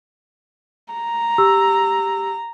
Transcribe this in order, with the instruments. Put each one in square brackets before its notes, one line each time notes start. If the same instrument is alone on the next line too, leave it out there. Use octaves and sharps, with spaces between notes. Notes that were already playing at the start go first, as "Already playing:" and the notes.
[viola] A#5
[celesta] G4 E6